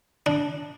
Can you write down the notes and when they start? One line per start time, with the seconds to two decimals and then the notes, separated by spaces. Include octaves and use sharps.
0.26 D4